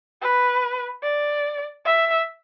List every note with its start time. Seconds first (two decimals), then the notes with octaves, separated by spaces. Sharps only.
0.22 B4
1.03 D5
1.85 E5